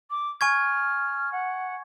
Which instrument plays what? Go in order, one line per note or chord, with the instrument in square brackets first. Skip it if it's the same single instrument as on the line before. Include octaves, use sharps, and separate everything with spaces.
[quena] D6
[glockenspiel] G#5 C#6 G#6 [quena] F6
[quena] F#5